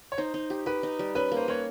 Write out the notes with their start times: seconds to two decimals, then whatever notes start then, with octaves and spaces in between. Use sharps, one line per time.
0.12 C#5
0.18 D#4 C5
0.34 D#4
0.50 G4
0.66 G4 B4
0.83 D#4
0.99 G3
1.15 C#4 B4
1.32 A#3
1.37 C5
1.48 A#3 C#5